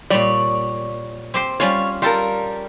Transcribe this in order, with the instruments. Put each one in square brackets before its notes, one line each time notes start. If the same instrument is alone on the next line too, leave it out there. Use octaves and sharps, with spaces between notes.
[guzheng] A#2 G3 [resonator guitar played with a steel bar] C#5 D5
[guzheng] C4 G4 C5
[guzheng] G3 C#4 F4 [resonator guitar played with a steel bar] C#5
[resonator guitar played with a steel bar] G3 A#4 [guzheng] F4 A4